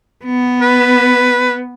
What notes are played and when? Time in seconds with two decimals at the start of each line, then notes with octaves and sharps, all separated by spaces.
0.25 B3
0.61 B4